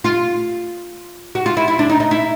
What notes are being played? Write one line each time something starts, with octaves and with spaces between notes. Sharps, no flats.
F4
F#4
F4
E4
E4
D4
D#4
D#4
E4